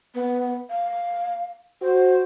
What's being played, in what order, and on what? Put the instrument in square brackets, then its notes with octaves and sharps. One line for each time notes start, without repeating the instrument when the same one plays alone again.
[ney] B3
F5
[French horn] F#4 [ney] C5